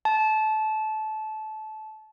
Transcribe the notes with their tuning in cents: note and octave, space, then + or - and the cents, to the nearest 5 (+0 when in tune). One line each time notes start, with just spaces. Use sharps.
A5 -20